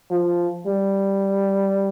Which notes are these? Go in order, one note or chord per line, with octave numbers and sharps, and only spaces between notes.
F3
G3